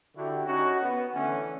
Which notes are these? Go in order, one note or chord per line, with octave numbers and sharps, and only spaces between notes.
D3 E4 F#4 G4
C#4 D#4 F#4
B3
D3 E3 A3 C#4